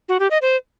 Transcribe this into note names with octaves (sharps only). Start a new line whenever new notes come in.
F#4
G4
D#5
C5